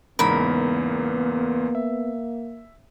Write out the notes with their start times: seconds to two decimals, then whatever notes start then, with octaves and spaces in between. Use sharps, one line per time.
0.19 E2 G#2 C#3 A#3 B3 A#4 B5
1.75 E5